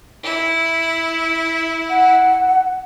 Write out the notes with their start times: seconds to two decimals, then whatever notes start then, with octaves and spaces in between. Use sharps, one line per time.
0.24 E4
1.90 F#5